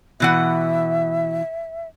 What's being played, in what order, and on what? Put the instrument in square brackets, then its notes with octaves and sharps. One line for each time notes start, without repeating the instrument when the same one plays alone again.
[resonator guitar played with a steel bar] B2 E3 F#5 [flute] E5